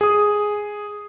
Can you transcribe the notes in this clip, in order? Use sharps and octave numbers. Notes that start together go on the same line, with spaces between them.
G#4 D#6